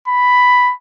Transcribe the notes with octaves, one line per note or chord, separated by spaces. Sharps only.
B5